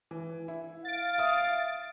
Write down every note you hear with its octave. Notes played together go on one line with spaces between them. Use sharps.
E3
E4
F5 A6 D7
E5 D#6